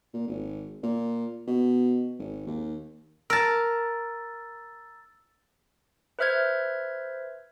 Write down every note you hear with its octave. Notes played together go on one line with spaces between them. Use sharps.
A#2
G#1
A#2
B2
G#1
D#2
A#4 A5 E6 A6
B4 C5 E5 F6 G6 G#6